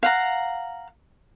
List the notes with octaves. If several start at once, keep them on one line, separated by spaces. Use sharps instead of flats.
F5 F#5 A#5